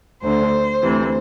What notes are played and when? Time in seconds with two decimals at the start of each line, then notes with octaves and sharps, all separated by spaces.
0.22 D2 D3 C5
0.81 D2 C3 E3